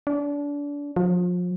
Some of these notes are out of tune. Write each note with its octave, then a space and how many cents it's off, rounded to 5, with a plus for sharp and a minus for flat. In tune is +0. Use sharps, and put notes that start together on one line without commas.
D4 -30
F3 +35